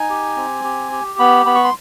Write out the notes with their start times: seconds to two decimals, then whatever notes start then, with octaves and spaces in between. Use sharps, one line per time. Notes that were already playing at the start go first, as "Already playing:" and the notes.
Already playing: D#4 G#5
0.09 G4
0.36 C4
0.64 G4
0.92 G4
1.19 B3 B5
1.46 B3 B5
1.55 C#6
1.64 C6